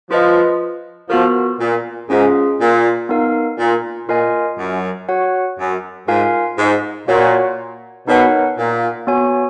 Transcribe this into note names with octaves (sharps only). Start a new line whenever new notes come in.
F3 F4 B4 D#5
F3 B3 F#4 A#4
A#2
G#2 C#4 F4 G#4
A#2
B3 D#4 A#4 F5
A#2
A#2 F4 A#4 D#5 G#5
F#2
F#4 C#5 F#5
F#2
G#2 F4 A#4 F5 G#5
G#2
A#2 F#4 C#5 F#5
B2 D#4 A#4 C#5 F#5
A#2
B3 F#4 C#5 G#5